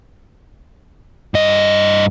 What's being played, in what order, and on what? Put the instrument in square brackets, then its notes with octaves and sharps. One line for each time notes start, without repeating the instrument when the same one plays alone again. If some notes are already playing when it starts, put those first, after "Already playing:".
[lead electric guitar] G2 D#5